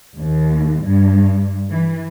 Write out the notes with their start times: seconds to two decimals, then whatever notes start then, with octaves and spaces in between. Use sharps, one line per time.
0.17 D#2
0.83 G2
1.70 E3